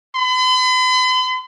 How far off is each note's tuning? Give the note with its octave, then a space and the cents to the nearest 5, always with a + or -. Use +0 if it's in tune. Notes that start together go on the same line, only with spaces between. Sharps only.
B5 +45